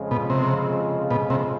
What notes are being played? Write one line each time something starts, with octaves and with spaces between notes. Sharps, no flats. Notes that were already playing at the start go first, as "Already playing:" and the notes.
Already playing: F2 C#3 F3 G#3
B2
C3
B2
C3